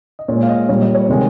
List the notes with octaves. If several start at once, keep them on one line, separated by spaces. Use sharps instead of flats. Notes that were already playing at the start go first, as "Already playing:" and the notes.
D#5
A#2 G#3 C#5
F5
D#5
A#2 G3 C#5
D#5
C#5
C3 D#3 G#3